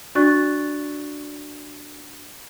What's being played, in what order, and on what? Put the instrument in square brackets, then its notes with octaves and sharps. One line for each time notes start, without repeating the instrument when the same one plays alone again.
[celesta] D4 F#4 D5 C#6 F#6 A6